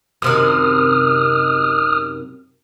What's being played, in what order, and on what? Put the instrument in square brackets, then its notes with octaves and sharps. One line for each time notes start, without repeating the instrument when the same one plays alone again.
[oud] F#2 C3 D#3 [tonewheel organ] D#6 F6